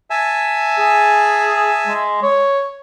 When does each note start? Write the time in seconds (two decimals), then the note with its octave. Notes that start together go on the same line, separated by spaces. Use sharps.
0.10 E5 G#5 A5
0.78 G#4
1.87 G#3
2.23 C#5